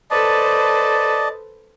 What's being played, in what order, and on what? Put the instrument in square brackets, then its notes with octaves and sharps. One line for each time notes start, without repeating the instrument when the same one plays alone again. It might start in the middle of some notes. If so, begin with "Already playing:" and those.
[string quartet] A4 B4 C5 [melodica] D5 D#5 A5